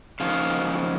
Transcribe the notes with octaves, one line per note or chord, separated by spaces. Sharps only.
C#3 F3 A#3 D#4 F5